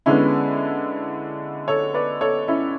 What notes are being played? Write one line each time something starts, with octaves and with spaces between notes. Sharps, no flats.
D3 G#3 B3 C#4 E4
A4 C#5
B4 D5
A4 C#5
C#4 E4